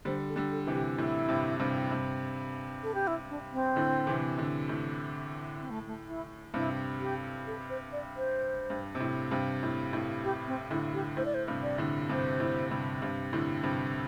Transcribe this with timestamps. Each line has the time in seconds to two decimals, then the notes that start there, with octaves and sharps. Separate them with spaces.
0.05 D3 G3 C5
0.29 A4
0.36 D3 G3
0.52 A4
0.67 C3 E3
0.75 G4
0.98 A2 E4
1.29 G2 C3
1.60 G2 C3
1.90 G2 C3
2.83 A4
2.94 G4
3.07 E4
3.29 D4
3.52 C4
3.76 A2 D3
4.07 C3 E3
4.38 A2 D3
4.69 A2
5.61 C4
5.70 A3
5.87 A3
6.07 E4
6.54 G2 C3 E4
7.00 G4
7.47 A4
7.70 C5
7.92 D5
8.17 C5
8.70 G2
8.95 C3
9.00 A2
9.31 G2 C3
9.63 A2
9.93 A2
10.24 G4
10.47 C4
10.70 A2 D3 E4
10.94 G4
11.17 A2 C5
11.25 D5
11.34 C5
11.47 G2 C3
11.63 D5
11.78 A2 D3
12.09 G2 C3 C5
12.40 A2
12.71 G2 C3
13.02 G2 C3
13.33 A2 D3
13.63 G2 C3